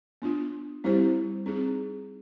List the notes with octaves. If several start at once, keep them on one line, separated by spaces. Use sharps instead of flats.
B3 D4 F4
G3 C4 E4 G4 C5
C4 D#4 G#4